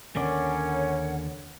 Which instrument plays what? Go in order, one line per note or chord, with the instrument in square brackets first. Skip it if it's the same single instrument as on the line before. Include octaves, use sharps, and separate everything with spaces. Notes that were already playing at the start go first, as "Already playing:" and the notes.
[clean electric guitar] D#2 D3 D5 [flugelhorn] C#4 [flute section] A#4 C#5 F#5